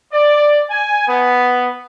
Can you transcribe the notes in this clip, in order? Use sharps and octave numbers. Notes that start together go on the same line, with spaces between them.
D5
G#5
B3